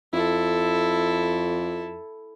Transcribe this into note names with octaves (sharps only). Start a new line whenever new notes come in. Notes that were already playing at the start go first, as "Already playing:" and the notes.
F2 E4 A4